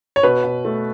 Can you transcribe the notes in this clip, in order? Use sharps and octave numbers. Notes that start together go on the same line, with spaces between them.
C#5
B2 B4
B2
A3